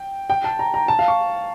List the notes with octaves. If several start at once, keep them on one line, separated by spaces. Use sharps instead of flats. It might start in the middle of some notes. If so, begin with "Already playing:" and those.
Already playing: G5
G5
A5
A#5
A#5
A5
F5
C#6